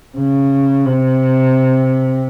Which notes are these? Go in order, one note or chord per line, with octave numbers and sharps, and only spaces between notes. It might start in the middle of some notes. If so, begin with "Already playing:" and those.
C#3
C3